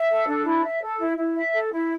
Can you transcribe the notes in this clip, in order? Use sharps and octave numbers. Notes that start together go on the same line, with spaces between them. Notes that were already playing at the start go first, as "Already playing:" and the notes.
Already playing: E5
A4
D4
E4
E5
A4
E4
E4
E5
A4
E4